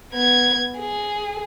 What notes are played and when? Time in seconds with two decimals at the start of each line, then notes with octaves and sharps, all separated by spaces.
0.12 B3 G#6
0.78 G#4